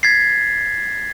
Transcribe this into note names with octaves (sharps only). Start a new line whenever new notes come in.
G#6 A6 B6 C7